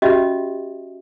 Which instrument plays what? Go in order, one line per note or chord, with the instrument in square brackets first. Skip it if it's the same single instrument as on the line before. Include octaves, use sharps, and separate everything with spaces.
[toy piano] C#4 F#4 G4 D#5 E5